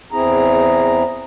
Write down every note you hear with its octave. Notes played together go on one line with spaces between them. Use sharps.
E2 C4 E4 G#4 A#5